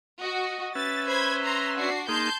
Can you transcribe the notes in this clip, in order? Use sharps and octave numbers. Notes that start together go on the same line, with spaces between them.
F#4 D#5
C#4 B4 E5 A6
C5 B5 G#6
A#5 C6
D4 F#4 C7
A#3 D#4 G#4 A5 C6 G6